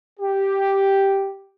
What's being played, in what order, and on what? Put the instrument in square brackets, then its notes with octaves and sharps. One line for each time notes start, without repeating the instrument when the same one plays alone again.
[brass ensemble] G4